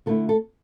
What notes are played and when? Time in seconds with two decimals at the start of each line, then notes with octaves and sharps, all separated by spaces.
0.06 D3 A3 E4 A4
0.29 A4